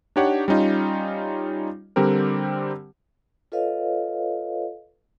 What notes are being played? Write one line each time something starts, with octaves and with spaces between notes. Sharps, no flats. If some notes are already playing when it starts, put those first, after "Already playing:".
D4 D#4 G4 C#5 F#5
G3 C#4 D#4 F4
D3 G3 C4 G4 A#4
F4 A4 B4 C#5 D#5 F5